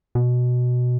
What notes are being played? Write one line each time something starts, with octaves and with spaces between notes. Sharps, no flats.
B2